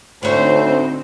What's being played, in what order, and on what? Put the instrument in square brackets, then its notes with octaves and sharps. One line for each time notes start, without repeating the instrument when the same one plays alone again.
[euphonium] D2 [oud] A2 C#5 [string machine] D3 C4 D#4 [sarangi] C5